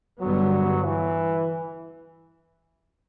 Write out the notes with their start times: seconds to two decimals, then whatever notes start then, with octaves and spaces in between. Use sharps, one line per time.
0.20 G2 D3 F#3 G3 B3
0.86 E3